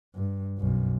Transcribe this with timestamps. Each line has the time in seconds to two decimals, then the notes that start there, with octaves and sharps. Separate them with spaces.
0.15 G2
0.58 B1 F#2